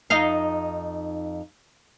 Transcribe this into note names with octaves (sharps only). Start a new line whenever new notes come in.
F2 D#4 F5